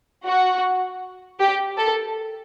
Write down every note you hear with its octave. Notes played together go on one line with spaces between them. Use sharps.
F#4
G4
A4